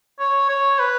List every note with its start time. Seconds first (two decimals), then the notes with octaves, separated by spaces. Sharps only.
0.19 C#5
0.49 C#5
0.79 B4